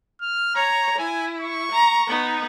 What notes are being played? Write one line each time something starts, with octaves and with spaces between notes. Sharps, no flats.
F6
C#5 A#5
E4 G#5
C#6
A#5
B3 D#4